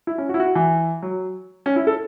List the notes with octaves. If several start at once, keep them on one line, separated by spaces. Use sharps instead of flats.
E4
C#4
F#4
E4
F#4
E3
F#3
C#4
E4
A4